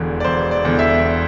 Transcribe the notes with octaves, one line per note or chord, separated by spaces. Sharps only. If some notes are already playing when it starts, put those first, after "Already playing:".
Already playing: E1 E2 D3
D5
E1 C5
D5
E2 D3
E5